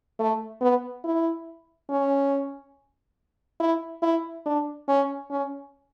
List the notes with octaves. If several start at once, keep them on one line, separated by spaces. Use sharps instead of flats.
A3
B3
E4
C#4
E4
E4
D4
C#4
C#4